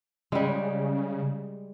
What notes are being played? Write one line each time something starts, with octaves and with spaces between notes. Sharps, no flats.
C#3 G3 G#3